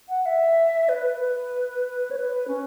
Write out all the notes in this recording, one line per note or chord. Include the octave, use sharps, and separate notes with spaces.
F#5
E5
B4
B4
C#5
B4
C#4